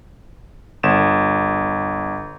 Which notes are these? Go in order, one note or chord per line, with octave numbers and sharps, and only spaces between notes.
G1 E7